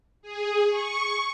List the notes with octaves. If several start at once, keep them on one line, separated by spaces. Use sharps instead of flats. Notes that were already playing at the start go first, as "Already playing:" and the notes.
G#4
C#6